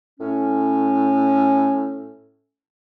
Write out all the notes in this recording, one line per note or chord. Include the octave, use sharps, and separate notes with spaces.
A2 C#4